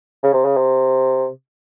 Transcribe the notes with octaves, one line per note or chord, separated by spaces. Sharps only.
C#3
C3
C#3
C3